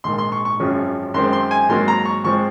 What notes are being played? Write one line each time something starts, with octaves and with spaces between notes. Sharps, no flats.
A#1 G#2 D#3 C6
C6
C#6
C#6
G#1 F#2 F3 G#3 C#4
F#2 D#3 G#3 C4 C6
C6
G#5
G#2 D#3 F#3 A#3 C6
A#5
C#6
G#2 F3 G#3 C4 C#6